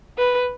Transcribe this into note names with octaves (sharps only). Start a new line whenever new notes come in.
B4